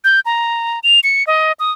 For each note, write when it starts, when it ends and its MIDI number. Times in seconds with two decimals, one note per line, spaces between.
0.04 0.20 91
0.26 0.80 82
0.83 1.00 101
1.04 1.26 97
1.27 1.52 75
1.60 1.72 87